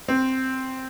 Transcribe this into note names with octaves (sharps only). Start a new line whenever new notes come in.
C4